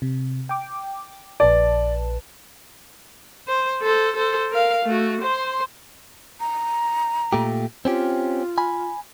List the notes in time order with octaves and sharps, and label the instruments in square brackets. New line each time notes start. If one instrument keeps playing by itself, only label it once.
[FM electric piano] C3
G5 D6
[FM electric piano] A#1 B4 A5 [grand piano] D5
[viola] C5
A4 C5
A4 C5
A#4 F5
A3 F#4
C5 C6
[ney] A#5
[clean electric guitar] A#2 A3 G4
[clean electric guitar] C4 C#4 G4 [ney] F4
[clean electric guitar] G#5 B5